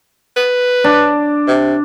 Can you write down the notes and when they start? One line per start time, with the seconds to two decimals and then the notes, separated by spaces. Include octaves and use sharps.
0.37 B4
0.84 D4
1.47 C3